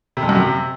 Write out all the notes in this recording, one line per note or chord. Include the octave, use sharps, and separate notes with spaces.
C3
F2
F#2
C3